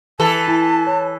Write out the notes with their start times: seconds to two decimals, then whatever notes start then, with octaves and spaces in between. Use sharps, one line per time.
0.20 E3 A4 A5
0.45 E4 G#5
0.87 C#5